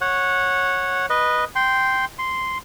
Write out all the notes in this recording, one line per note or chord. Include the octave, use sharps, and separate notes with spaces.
C#5 F#5
B4 D#5
G5 C6
C6